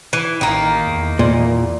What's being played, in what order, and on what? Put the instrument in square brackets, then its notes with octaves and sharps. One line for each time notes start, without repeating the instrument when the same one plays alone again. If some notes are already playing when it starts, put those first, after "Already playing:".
[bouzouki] E3
[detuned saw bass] A1 [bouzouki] D#3 A#3
[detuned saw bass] E2
[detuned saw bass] E2 [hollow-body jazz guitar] A#2